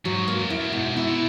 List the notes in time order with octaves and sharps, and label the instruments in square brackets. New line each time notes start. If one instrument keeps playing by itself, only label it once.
[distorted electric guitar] G#2 [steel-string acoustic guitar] F#3
[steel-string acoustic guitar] A#3
[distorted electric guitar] F#2
[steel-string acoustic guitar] E4
[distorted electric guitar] F#2
[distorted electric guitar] G#2 [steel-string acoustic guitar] B2
[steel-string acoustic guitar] E4
[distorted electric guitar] B2